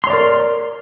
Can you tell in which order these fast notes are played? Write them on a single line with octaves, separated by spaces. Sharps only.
C6 C#5 D5 A#4